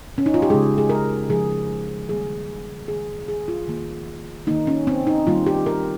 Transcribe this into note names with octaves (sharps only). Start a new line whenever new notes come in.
C#4
D#4
F4
G4
C#3 G#3 G#4
G#4
A#4
C#3 F3 G#3 G#4
D#3 G3 A#3 G#4
D#3 A#3 G#4
G#4
F4
D#3 A#3
D#3 A#3 D#4
C#4
C4
D#4
D#3 G3 A#3 F4
G4
A#4